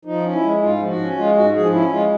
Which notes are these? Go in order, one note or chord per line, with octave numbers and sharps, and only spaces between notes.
F3 D#4
C#4
E4
G#3
G#2 F4
F3
F#4
C#4
G#3 F4
G#2 F#4
F3 G#4
C#4 E4
G#3 F4